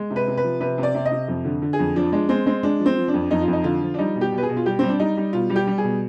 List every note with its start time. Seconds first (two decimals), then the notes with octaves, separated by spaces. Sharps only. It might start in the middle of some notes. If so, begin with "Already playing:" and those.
Already playing: G#3
0.10 C3
0.16 B4
0.27 C3
0.38 B4
0.44 F3
0.60 C3 B4
0.78 C3
0.83 D5
0.95 C3
1.06 D#5
1.12 C3
1.28 F2
1.45 D3
1.62 D3
1.73 G#4
1.79 F2
1.96 F3 D4
2.12 G#3 D4
2.29 G#3 C4
2.46 G#3 C4
2.63 G#3 D4
2.80 F3
2.86 C4
2.97 F3
3.08 D4
3.14 F2
3.31 F2 D#4
3.42 F4
3.48 F2
3.53 D#4
3.64 D3 F4
3.82 F3
3.94 D4
3.98 G3 D#4
4.16 B2
4.21 G4
4.32 B2
4.38 B4
4.43 G#4
4.49 B2
4.57 F4
4.66 G3 G4
4.79 G3 C4
4.89 D4
5.00 G3 D#4
5.17 G3
5.33 B2 F4
5.50 G3
5.56 G4
5.67 G3
5.78 G#4
5.84 B2